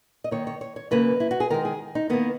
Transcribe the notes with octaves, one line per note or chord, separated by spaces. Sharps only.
D#5
D#3 A#3 C#5
C#5
C#5
C#5
C#3 F#3 A#3 B4
E4
F#4
G#4
D#3 G#3 A#4
G#4
D#4
D#3 A#3 B3